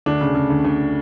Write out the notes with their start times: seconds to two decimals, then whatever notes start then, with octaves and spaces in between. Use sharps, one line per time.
0.06 D2 D4
0.21 C#3
0.35 C#3
0.50 D2
0.65 D2